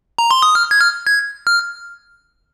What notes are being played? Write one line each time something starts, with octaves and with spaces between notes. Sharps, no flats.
A#5
C6
D#6
F6
G#6
F6
G#6
F6